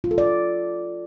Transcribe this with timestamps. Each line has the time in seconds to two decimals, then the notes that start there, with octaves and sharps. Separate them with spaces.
0.04 F4
0.11 A4
0.18 D5